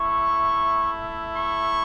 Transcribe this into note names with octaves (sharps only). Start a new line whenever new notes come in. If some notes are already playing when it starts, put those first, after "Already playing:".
Already playing: A3 E4 C#6
C#6